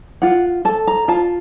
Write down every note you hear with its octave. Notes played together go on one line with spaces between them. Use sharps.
F4 F#5
A4 A5
A#5
F4 A5